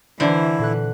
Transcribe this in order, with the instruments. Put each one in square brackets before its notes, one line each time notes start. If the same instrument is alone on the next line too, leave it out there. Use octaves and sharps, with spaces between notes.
[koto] D3 C5 [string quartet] E3 [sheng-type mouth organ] E4
[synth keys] A#2 A4 F#6